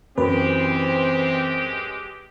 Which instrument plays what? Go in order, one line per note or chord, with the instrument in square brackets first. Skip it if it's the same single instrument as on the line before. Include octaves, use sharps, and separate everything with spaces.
[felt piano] F#2 [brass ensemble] E3 C4 [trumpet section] G#3 G4 [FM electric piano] B4